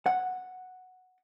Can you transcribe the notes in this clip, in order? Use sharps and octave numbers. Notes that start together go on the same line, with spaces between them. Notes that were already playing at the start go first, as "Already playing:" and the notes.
F#5